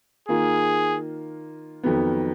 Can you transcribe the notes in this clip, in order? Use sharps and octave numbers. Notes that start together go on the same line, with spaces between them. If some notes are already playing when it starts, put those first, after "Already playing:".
D#3 A#3 F4 G#4
F2 D#3 F#3 B3